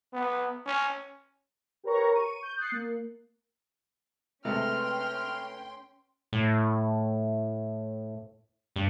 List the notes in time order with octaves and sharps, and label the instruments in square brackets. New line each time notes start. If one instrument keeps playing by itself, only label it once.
[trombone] B3
C#4
[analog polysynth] G4 A#4 B4 C#5 A#5 C#6
C#6 D#7
G6
D#6 F#6 G6 A6 C7 C#7
A#3
[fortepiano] C3 G#3 A3 [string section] C#4 G5 C6 [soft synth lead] B4 [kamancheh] F6
[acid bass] A2
G2